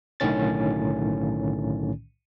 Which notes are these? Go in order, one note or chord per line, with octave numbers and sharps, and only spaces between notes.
B1 A2 D3 D#3 C#4 A6